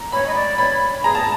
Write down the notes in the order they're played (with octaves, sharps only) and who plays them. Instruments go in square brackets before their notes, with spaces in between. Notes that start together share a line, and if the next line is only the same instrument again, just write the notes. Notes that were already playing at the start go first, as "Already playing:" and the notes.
Already playing: [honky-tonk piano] A#5
[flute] C#5 [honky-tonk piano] B5
[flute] D#5
D5
[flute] C#5 [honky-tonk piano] B5
[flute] G#4 [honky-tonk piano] A#5
[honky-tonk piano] A5